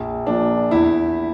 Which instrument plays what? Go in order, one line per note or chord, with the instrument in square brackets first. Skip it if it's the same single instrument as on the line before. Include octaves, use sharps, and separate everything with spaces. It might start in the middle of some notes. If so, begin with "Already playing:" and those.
Already playing: [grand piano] A#1
A#2 F3 D4
E2 E4